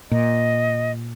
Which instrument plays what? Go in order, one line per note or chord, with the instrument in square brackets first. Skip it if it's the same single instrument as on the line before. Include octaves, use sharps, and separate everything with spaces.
[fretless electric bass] A#2 [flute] D#5